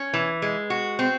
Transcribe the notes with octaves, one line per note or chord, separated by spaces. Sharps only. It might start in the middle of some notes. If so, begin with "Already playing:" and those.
Already playing: C#4
E3
G#3
F#4
C4